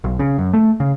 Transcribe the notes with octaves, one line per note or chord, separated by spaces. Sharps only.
B1
C#3
F#2
A3
C#3